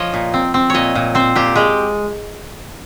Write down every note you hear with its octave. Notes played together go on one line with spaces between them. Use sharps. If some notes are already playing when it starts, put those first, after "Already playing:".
Already playing: F3 C#5 D#5
A#2
C4
C4
A#2 C#5 D#5
A#2
C4 C5
A#2 G4
G#3 G4